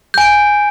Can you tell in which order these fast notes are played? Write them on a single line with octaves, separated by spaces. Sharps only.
G6 G#5 D7